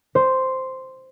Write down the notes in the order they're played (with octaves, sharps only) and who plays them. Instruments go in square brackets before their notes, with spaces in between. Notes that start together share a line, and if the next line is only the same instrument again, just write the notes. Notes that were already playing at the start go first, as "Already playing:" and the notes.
[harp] C5